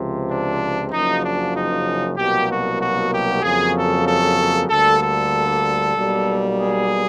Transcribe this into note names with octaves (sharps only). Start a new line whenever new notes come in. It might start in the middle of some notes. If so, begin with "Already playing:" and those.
Already playing: C#2 C3 F3
D4
F#1 F#2 C#3 F3 D#4
D4
D#4
C2 B2 F#3 A#3 G4
F#4
F#4
G4
F2 C#3 F#3 A#3 G#4
A4
A4
D2 D3 G3 A#3 A4
A4
B1 B2 G3 A#3
G#4